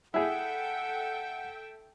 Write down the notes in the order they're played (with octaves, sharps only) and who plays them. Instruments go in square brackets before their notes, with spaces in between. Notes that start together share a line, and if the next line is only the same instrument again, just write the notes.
[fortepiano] E4 G#4 [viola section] A4 E5 G5 [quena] F#5